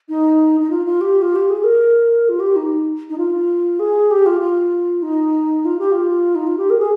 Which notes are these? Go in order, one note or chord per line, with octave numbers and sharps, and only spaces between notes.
D#4
D#4
F4
F4
G4
F4
G4
G#4
A#4
F4
G4
D#4
D#4
F4
G#4
G4
F4
F4
D#4
F4
G4
F4
D#4
F4
G4
A#4
G#4